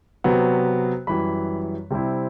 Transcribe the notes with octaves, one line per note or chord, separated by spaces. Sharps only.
C3 F#3 B3
F#2 E3 G3 B5
C3 G3 C4 E4